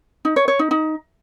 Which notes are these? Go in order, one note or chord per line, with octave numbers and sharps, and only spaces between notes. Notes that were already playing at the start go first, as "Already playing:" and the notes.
D#4
C#5
C#5
D#4
D#4